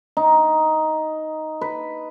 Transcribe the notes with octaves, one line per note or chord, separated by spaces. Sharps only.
D#4
B4